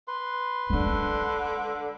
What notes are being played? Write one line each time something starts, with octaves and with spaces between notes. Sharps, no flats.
B4 C6
D3 G#3 D4